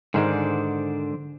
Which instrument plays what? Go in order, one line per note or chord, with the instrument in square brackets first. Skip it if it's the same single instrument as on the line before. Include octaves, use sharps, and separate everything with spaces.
[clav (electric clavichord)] G#2 D#3 G#3 [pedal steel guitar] D3 C5 D5